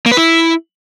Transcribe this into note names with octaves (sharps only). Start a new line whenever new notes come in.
A#3
B4
E4